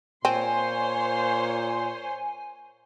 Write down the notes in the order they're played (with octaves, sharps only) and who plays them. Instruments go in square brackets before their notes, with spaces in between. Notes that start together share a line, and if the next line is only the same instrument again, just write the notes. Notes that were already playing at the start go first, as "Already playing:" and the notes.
[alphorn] A#2 [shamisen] C4 [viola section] C5 C#5 C6 [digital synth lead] G#5